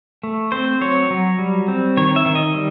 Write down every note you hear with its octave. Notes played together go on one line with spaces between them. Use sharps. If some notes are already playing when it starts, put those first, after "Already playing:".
A3
C4 C5
F#3 C#5
F#3
G3
C4
D#3 C#5
E5
D#3
D#5
G3